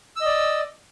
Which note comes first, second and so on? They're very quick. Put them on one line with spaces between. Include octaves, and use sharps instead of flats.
E6 D#5 D5